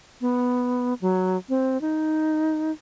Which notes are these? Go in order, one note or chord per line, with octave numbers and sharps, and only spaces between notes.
B3
F#3
C4
D#4